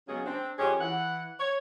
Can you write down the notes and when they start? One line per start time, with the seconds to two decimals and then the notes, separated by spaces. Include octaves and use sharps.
0.08 C#3 F#3 G#3 B3 C#4 G#4
0.26 C4 D4
0.59 F2 C#4 G4 G#4
0.81 E3 F#5
1.39 C#5